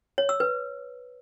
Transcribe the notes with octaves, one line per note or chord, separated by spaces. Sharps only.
C#5
E6
B4